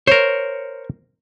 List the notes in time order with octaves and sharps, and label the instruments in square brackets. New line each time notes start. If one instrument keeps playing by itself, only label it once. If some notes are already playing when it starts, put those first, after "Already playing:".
[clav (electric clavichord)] A#4 C5 [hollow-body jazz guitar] C#5